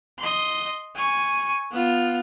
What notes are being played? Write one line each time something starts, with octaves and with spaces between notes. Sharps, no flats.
D#5 C6
G#5 C#6
B3 F4